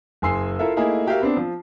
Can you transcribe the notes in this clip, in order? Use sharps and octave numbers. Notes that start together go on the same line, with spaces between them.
F#1 G#4 G#5 C6 E6 C7
E4 F4 A4 A#4 E5
A3 A#3 D#4 E4 G#4
F#4 G4 A#4 E5 F5
B3 C4 D4
F3